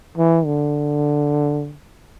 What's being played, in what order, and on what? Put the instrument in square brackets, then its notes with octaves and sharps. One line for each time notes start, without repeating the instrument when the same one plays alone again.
[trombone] E3
D3